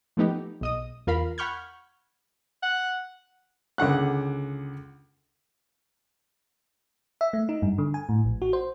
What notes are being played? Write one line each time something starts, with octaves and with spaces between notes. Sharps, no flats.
F3 A3 B3 D#4 G4
B1 D#5 D#6
E2 F4 A#4 F5 B5
F#5 B5 C#6 F6 G6 G#6
F#5
C#2 D3 F#5 F#6
E5
A3
D#4
G2
D3
G#5
A2
A#1
F#4
C5